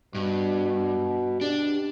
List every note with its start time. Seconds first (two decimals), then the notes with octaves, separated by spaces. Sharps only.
0.15 G2 B2
1.41 D4 G4